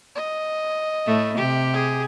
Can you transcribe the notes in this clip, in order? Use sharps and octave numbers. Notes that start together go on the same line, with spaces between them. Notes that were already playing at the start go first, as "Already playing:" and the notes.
D#5
A2 A3
C3 G4
G#4